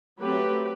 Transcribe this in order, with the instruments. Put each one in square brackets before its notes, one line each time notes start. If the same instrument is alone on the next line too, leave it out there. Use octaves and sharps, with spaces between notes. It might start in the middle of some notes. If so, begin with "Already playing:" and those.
[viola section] F#3 A3 C4 G4 B4